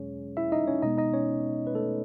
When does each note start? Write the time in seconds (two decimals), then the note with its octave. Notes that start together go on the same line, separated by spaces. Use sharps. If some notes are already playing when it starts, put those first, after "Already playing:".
Already playing: E2 B2 F#3 G#3 C#4 G#4 C#5
0.37 E4 E5
0.52 D#4 D#5
0.67 C#4 C#5
0.82 B2 G#3 B3 D#4 D#5
0.98 D#4 D#5
1.14 C#4 C#5
1.67 B4
1.74 A3 A4